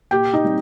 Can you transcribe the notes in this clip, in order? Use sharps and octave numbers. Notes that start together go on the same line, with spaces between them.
A#2 G4 G5
D#4 D#5
G3 C4